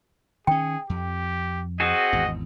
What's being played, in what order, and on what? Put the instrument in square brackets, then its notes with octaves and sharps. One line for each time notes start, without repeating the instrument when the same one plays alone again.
[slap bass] D#3 C#4 [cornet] G#4 [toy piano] G5
[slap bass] F2 [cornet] G4
[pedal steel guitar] C4 F#4 G#4 [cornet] D#5
[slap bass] G#1 E2